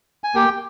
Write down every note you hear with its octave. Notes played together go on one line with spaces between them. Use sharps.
G#5
A#3 G4 G5